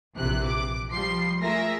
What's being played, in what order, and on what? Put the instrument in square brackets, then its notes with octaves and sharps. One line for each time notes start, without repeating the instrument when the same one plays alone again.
[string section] A#1 C3 E3 F#6
D6
F3 G3 C6 C7
A3 F4 G#4 A#4 E5 A#6